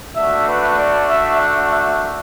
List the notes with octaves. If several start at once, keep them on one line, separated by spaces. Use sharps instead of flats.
A3 D4 F#4 E5
B4
D5
E5
F#5
E5